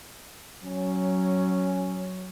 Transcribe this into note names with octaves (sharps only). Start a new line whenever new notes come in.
F#3 C#4